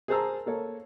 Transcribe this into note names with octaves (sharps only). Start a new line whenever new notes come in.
G#4 A#4 C5 A5 A#5 E6
A#3 A4 C#5